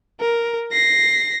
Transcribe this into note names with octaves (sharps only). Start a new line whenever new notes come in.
A#4
A#6 C7